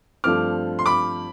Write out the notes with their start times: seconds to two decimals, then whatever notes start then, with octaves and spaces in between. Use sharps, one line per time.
0.24 G2 F3 A3 C4 D6 F6
0.79 C6
0.86 B5 D6